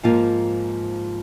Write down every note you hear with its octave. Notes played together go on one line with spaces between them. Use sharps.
G#2 F3 A#3 F4